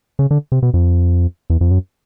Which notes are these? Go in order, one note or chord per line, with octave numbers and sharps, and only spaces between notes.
C#3
D3
C3
B2
F2
E2
F2
F#2